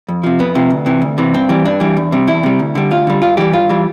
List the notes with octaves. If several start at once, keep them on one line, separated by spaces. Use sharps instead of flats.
F2
C3 F3
F2 B3
C3 F3
D2
C3 E3
D2
C3 E3
G2 C4
E3 G3
G2 D4
E3 G3
E2
C3 G3
E2 E4
C3 G3
D2
D3 G3
D2 F4
D3 G3
G2 F4
E3 G3 G4
G2 F4
E3 G3